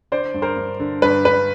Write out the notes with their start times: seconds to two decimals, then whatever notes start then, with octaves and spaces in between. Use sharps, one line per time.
0.12 D3 C5 D5
0.34 G2
0.42 A#4 C5
0.57 G2
0.80 D3
1.02 G2 B4
1.25 G2 B4